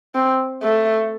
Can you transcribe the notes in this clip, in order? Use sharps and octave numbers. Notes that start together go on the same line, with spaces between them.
C4
A3